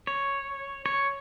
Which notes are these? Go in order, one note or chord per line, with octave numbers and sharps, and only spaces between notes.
C#5
C#5